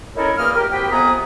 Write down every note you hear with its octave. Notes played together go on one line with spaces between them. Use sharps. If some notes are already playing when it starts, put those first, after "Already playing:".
C#4 D#4 E4 A4 A#4 C#5
E2 A#2 A#3 D#6 F6
G4 A#4
C4 F#4 G4 B4 G5
F2 C3 B3 G#5 A#5 D#6